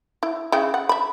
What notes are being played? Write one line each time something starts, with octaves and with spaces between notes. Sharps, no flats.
E4
C#3 E4 G5
F#5
E5 B5